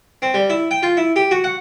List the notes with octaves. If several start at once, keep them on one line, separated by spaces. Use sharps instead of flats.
C4
G3
E4
G5
F4
E4
G4
F#4
F#5